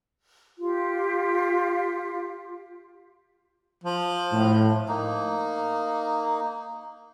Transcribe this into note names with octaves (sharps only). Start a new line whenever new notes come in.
F4 G4
F3
A2
A#3 D#4